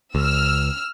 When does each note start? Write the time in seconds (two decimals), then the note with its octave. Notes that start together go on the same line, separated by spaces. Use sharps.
0.15 C#2 E6 F6